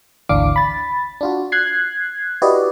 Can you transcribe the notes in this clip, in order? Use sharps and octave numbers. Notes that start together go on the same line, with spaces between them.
G#1 D2 E3 D4 F5 D6
B5 A6
D4 F4 F#4
F#6 G#6 C7
E4 F#4 G4 B4 D5 D#5